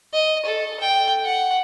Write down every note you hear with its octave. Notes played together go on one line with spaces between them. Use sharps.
D#5
A4
G5
F#5